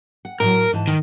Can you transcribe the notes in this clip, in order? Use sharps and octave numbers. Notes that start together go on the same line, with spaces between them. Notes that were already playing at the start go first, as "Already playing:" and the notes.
F#5
A2 D#3 F#3 A#4
G#2 E3 A5
D#3